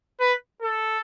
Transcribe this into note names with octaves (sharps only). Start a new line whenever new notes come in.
B4
A4